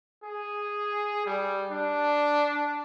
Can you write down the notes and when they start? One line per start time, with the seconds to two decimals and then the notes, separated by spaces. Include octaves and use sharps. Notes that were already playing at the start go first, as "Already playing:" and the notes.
0.23 G#4
1.26 G3
1.71 D4